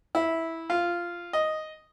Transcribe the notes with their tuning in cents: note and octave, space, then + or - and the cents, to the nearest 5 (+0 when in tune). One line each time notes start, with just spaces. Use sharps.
E4 -10
F4 -10
D#5 +0